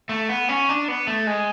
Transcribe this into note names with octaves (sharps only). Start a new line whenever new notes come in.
A3
B3
C#4
D4
B3
A3
G#3